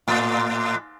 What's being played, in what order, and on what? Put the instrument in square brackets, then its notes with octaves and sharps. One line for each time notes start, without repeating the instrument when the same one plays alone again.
[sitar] A2